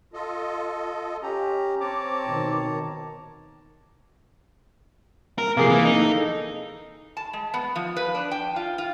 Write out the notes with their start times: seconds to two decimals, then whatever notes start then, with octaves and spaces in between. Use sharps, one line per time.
0.13 F4 A4 D#5
1.22 C#4 G4 A#5
1.80 C4 C#5 A5 A#5 D6
2.26 B2 D#3
5.38 A#4
5.57 C3 F3 A#3 G#4 C7
5.70 E3
5.85 D#4
6.00 A4
7.17 A5
7.33 G#3
7.54 B3
7.76 F3
7.97 B4
8.15 D4
8.31 G5
8.56 F4
8.78 F4